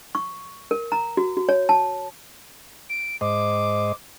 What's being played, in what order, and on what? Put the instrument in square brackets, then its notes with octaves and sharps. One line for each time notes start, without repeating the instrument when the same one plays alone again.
[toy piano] C#6
A#4
A#5
F#4
F#4
C#5
A5
[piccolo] D7
[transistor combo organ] G#2 C5 D#5 [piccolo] D6